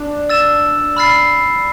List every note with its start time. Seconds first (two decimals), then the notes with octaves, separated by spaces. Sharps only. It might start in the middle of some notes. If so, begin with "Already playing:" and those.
Already playing: D4
0.30 E6 A6 E7
0.97 B5 F6 A6 C7